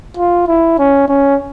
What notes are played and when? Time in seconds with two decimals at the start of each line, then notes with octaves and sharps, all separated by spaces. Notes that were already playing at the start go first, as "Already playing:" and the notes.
0.17 F4
0.48 E4
0.79 C#4
1.08 C#4